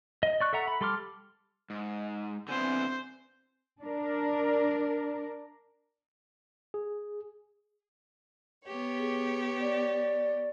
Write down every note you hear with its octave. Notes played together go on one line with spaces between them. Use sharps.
D#5
D5 C#6 F#6
A4 E5 F#5 A#5
B5
G3 A4 C6 D6 F6
G#2
D3 B3 C4 E4 C5 G#5
D4 A#4
G#4
B3 G4 C#5
G#4
D5